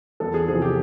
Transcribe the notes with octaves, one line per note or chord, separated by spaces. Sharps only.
E2 A4
G#4
C3 F3 G#4
G4